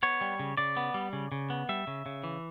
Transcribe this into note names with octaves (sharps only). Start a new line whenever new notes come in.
B3 C#5
G3
C#3
C#3 D5
B3
G3
C#3
C#3
B3
G3 E5
C#3
C#3
E3